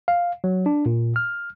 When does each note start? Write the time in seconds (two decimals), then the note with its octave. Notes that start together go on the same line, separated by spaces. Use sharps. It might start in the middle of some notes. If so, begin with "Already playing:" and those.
0.08 F5
0.44 F#3
0.66 D4
0.86 A#2
1.16 F6